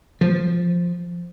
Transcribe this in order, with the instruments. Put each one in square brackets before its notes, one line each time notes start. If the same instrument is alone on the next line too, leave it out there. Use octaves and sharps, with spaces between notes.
[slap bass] F3